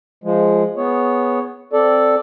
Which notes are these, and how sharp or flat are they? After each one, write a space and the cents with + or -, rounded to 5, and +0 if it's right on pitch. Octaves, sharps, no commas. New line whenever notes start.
F3 -10 G#3 +0
B3 +0 G#4 +0 C#5 +0
C4 +0 A4 +0 D5 +0